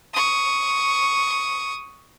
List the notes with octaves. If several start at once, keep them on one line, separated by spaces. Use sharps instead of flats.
C#6 D#6